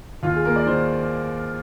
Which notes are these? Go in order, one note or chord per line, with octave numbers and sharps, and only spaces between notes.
D#2 F4
G#4
A#3 A#4
D5
D#3 C5